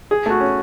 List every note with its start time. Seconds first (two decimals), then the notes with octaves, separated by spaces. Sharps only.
0.11 G#4
0.26 A3 F#4
0.40 C#4